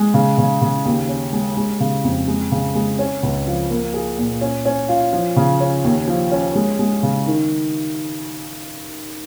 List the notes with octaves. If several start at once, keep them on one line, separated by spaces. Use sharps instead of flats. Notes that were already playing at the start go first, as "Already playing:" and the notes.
Already playing: G#3
C#3
C#3
C#3
D#2
C#4
G#3
G#3
C#3
F2
G#3
C#3
G#3
C#4
C#2
F3
A#3
G#4
A#2
C#4
C#4
F4
F3
C#3
C#4
D#2
F3
C#4
G#3
G#3
C#3
D#3